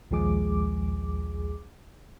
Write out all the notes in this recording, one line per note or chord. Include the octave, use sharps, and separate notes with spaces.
A#1 D#2 F3 G#3 G#4 D6